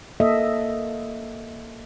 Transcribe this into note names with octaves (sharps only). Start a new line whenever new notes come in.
A#3 A4 D#5 E5